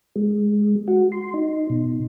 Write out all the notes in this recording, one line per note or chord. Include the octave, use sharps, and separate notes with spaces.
G#3
F#4
C6
D#4
B2